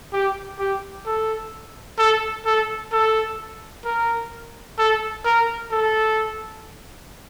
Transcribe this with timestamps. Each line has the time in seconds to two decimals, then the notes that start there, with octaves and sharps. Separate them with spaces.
0.13 G4
0.59 G4
1.06 A4
1.98 A4
2.46 A4
2.92 A4
3.84 A#4
4.78 A4
5.25 A#4
5.71 A4